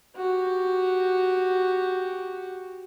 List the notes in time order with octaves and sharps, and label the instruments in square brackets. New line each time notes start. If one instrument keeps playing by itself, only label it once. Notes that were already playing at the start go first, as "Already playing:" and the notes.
[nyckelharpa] F#4 G4